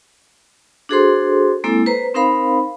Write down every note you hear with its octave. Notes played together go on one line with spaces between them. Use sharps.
D4 F#4 G#4 A4 C5 C6
G#3 A#3 C4 E4 A4
B4 C5 A#5
C4 D#4 A#4 C5 F5 B5